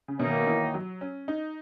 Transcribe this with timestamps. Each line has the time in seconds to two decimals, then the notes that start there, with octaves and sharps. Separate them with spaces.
0.08 C#3
0.19 F#2 B2 D#3 A#3 D#4
0.46 E3
0.74 F#3
1.01 C#4
1.28 D#4